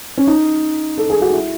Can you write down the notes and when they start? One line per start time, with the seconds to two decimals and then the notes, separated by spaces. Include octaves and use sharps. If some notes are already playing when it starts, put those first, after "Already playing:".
0.17 C#4
0.27 D#4
0.98 A4
1.10 G#4
1.22 F#4
1.33 E4